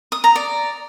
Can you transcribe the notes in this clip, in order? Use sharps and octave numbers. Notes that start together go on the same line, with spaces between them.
D#6
A#5
D5